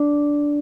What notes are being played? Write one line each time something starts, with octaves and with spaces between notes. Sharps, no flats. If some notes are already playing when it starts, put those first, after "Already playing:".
Already playing: D4